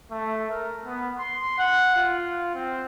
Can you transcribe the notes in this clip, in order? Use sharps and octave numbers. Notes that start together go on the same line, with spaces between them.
A3
A#4
B3
C6
F#5
F4
C4